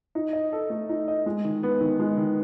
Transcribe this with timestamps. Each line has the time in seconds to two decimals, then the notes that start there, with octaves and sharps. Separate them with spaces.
0.15 D#4
0.33 D#5
0.53 A4
0.70 A3
0.89 D#4
1.08 D#5
1.26 G#3
1.45 D#3
1.63 B3
1.81 D#3
2.00 G#3
2.18 D#3